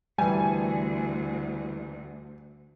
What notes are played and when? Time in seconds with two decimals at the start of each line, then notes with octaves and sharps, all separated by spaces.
0.18 D2 E3 G3 G#5